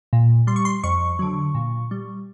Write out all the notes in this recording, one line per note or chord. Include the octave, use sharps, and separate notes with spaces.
A#2
G3 C6
C#6
C6
F2 C#6
D3 F#3
A#2
G3